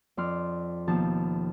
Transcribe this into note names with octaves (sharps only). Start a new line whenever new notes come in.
F2 D5 C6 F6
D#2 B2 F3 A5